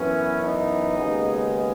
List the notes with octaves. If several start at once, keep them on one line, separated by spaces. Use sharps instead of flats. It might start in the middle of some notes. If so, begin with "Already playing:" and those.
Already playing: F#2 E3 B3 C#4
D#4
D#2 C#3 G#3 B3